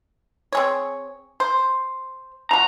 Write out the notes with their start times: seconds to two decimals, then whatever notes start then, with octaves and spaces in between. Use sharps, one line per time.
0.52 C4 G#4 C#5
1.40 C5
2.51 F3 F#4 A#5